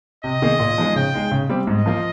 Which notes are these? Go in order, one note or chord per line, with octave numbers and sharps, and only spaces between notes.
C3 D#5
D#3 A#3 D#4 G#4
A#2
F3 G#3 D#4 G#4
C#3 G5
G#3 D#4 G#4
C#3
G3 C4 G4
G#2 D#5
F3 A#3 F4